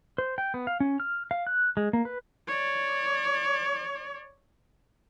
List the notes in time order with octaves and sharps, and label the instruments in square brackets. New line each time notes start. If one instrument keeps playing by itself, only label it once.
[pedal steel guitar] C5
G5
B3
F5
C#4
F6
F5
F#6
G#3
A#3
B4
[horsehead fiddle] C#5 D5